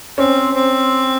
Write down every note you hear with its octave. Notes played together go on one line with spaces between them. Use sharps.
C4 C#4
C4